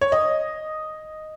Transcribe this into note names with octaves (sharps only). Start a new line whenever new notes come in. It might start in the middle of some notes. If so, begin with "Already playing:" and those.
C#5
D#5